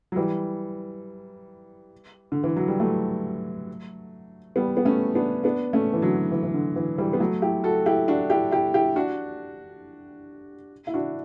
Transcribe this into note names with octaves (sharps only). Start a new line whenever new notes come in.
F#3
E3 G3
D3
E3
F#3
G3
F#3 A3
G3 B3
B3
A3 C#4
B3 D4
B3 D4
A3 C#4
E3
D3 F#3
E3
E3
D3
E3
E3 G3
B3
F#3 A3
E4 G4
F#4 A4
E4 G4
D4 F#4
E4 G4
E4 G4
E4 G4
D4 F#4
E4
D4 F#4